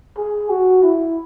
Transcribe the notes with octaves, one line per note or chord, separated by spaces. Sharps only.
G#4
F#4
E4